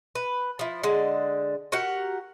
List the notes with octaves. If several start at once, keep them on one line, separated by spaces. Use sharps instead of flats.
B4
F3 E4
D3 G#3
F#4 G4 A#4 F#5